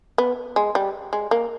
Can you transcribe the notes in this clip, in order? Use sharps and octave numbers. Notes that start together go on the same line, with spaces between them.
B3
G#3
G3
G#3
A#3